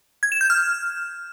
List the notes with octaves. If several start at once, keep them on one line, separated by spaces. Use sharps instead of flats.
G#6
E7
G6
F6